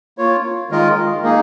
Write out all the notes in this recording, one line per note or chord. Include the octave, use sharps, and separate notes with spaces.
A#3 F4 C#5
D#3 G#3 F4 A#4 D#5
A#3 D#4 G#4